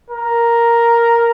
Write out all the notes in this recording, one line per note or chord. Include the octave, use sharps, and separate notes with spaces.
A#4